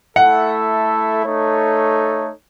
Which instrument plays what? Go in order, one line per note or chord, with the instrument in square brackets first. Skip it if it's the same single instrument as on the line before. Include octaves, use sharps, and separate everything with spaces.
[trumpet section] A3 E4 A4 [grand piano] F#5
[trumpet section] A3 D#4 A4 C#5